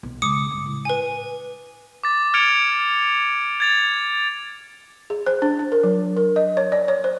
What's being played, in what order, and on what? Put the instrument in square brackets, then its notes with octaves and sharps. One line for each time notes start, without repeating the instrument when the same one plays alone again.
[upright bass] B1
[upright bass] C#3 G#3 [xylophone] D6 D#6 C#7
[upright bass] G2
A2
[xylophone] B4 G#5
[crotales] D6 A6
F6 G#6 A6 C#7 D7 F7
G#6 A6 F7
[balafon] G#4
C5
D4
D4
A#4
F#3
A#4
D#5
C#5
D5
C#5
C5